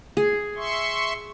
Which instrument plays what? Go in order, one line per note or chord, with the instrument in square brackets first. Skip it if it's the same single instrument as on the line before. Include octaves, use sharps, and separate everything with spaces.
[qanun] G#4
[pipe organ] E5 C6 C#6